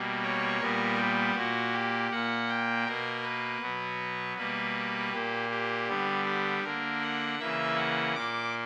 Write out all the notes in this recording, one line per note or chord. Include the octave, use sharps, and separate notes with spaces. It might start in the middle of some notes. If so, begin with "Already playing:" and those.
Already playing: B2 G3 A#3
C#5
A#2 G3 B3 A#4
G4
A#2 A#3 F#4
G4
A#2 A#3 F#5
G5
B2 A#3 A#4
B4
B2 F#3 B3
B2 G3 A#3 B4
A#2 A#3 G4
G4
D3 G3 B3
G4
D3 A#3 A#4
F#5
C#3 E3 A#3 E5
F#5
A#2 A#3 D6